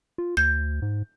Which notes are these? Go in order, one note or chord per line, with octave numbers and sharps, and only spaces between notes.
F4
D2 G6
G#2